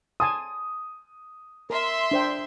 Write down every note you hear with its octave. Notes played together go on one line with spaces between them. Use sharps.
G#5 A5 C6 D#6
A#4 E5 C6
D4 C5 G5